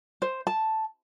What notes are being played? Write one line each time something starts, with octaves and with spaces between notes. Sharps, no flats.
C5
A5